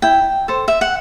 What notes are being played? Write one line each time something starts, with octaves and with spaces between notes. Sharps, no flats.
E4 G5
A4 C5
E5
F#5